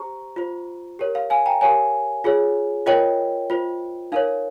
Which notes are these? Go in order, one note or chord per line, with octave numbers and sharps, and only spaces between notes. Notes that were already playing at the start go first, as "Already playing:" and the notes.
Already playing: G4 C5 A#5 C#6
F4 C5
G4 A#4 C#5
F5
F5 G#5
G5 A#5
G4 A#4 C#5 F5 G#5
F4 G#4 C#5
F4 A#4 C#5 D#5 G5
F4 C5
D#4 A#4 C#5 F5